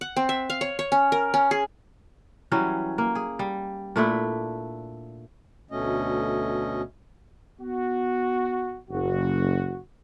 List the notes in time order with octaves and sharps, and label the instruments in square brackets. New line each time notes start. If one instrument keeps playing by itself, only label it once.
[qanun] F#5
C4
E5
F5
C#5
C#5
C#4
A#4
C#4
G#4
[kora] E3 F#3 G3 C#4
A#3
G#4
G3
A#2 A3 D4 E4
[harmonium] D2 B2 A3 C#4 D#5
[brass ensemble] B3 F#4
F#1 F#4